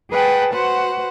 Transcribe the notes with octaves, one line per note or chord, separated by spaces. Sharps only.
G#4 B4 F#5 G5 A5
F#4 B4 C5 F#5